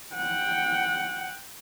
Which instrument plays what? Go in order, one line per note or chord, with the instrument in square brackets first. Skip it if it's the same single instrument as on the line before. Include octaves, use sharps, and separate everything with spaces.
[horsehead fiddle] F#5 G5